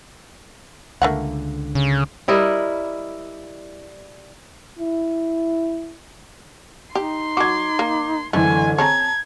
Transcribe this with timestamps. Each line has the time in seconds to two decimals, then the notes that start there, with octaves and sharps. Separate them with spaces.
1.02 C#2 D3 A3 A#3 F#5
1.75 C#3
2.28 G3 E4 A#4 D#5
4.79 E4
6.95 D#4 G4 C6
7.37 F#3 F#4 D6 G#6
7.79 A#3
8.33 F#1 D3 E3 A3 G#5
8.78 C4 G#4 C#5 A5 A#5 G#6